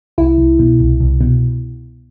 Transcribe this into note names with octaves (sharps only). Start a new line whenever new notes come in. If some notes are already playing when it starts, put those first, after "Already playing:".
C2 E4
C2
B2
C2
C2
B2